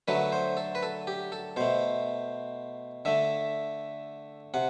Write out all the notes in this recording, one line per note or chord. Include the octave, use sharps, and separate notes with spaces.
D3 F#3 A3 B4
C5
A4
B4
A4
G4
A4
B2 A3 C5
D3 A3 E5
C3 F#5